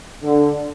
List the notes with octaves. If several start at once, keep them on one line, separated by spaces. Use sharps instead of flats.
D3